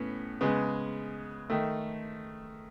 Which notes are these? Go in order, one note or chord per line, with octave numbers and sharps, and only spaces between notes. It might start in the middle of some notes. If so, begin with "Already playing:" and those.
Already playing: A2 B3 C#4
C#3 G#3 B3
D#3 A3